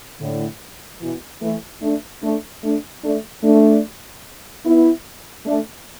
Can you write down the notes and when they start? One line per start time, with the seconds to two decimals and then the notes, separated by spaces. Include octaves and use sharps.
0.21 A2 D3
1.01 B2 E3
1.42 E3 A3
1.82 A3 D4
2.23 A3 D4
2.63 A3 D4
3.04 A3 D4
3.43 A3 D4
4.65 B3 E4
5.45 A3 D4